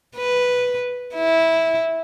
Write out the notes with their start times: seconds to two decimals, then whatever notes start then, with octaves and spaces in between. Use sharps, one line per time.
0.16 B4
1.15 E4